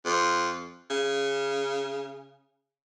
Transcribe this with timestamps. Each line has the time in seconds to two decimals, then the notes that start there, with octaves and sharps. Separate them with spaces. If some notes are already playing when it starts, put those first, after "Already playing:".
0.05 F2
0.90 C#3